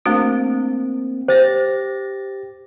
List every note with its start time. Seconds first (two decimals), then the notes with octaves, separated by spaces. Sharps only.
0.06 A3 A#3 C4 D4 F#4
1.28 G4 C5 A6 A#6